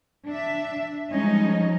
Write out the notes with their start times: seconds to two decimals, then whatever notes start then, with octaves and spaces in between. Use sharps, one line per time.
0.26 D4 E5
1.11 F3 G3 G#3 C#4 D#4 D#5